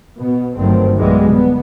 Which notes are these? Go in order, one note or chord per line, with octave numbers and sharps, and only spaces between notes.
B2 B3
G1 G2 D#3 F#3 A3 C4
B1 E3 G3 G#3 B3
D3 B3